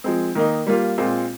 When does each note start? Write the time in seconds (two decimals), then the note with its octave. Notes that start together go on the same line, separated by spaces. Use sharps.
0.04 F3 G#3 C4
0.35 D#3 A#3 D#4
0.67 G3 A#3 F4
0.98 A#2 G#3 C4 F4